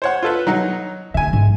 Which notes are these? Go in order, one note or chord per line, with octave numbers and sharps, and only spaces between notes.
C5 C#5 F#5
F4 A4 B4
F#3 D#4 F#5
D3 A3 E5 G#5
G#2